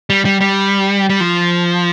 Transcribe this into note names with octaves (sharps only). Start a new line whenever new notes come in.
G3
G3
G3
G3
F3